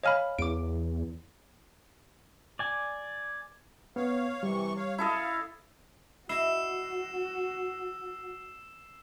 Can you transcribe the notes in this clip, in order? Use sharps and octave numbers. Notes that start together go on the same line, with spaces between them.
C#5 D#5 F5 G#5 B5 F6
E2 D6 D7
D5 G#5
B3 C#5 F5
C3 E3 G3 C#6
C#5 F5
E4 A4 D#5 F5
E4 F#4 D#5 E5 E6 C7 E7